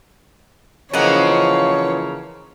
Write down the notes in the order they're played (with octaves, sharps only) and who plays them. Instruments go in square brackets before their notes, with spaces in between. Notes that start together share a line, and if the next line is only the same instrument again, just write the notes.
[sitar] C#3 A#3 [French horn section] E3 F3 [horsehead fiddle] C#5 [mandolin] D#5 F#5